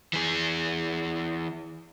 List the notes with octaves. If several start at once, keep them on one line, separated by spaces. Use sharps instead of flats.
E3 G#4